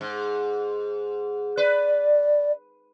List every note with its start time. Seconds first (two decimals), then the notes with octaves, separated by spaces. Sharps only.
0.01 G#2
1.57 B4 D5